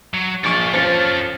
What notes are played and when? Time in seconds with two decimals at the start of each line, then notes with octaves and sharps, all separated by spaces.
0.14 F#3
0.44 A#1 F4 D5 C#6
0.73 F3 C#4 F4 A4